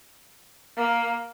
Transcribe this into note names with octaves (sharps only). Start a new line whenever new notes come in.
A#3